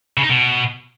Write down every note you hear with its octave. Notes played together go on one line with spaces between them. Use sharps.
C#3
D#4
B2